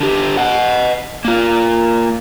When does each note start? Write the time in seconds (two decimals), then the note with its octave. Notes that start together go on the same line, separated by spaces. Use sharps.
0.01 D3 G4
0.37 D#5 F#5
1.25 A#3 F4